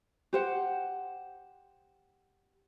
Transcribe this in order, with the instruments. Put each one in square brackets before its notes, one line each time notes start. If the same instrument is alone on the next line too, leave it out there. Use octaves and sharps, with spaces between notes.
[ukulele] G4 C5 F#5